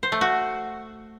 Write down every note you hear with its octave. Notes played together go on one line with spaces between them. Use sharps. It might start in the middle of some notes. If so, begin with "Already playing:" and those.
C5
A3
F#4